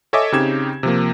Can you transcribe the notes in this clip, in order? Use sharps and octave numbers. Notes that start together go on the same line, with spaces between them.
A4 C#5 D#5 E5 G#5 D6
C#3 C4 D#4 G4 G#6 E7
C3 F3 A#3